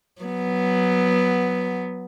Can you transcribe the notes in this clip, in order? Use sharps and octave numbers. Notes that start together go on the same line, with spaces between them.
F#3 B3